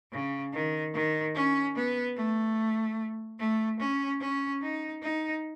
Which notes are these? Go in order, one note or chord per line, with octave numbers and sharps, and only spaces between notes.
C#3
D#3
D#3
C#4
B3
A3
A3
C#4
C#4
D#4
D#4